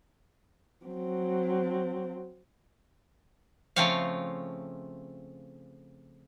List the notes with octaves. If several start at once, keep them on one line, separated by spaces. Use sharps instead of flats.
F#3 C4
C#3 F3 A3 C4 C#5 F5